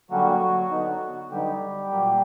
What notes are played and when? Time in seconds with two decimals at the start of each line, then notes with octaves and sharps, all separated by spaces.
0.11 D3 F#3 G3 A#3 C#4 F#4
0.71 D3 F#3 B3 D#4
1.31 D3 F#3 G3 B3 D#4 G4
1.91 A#2 F#3 A#3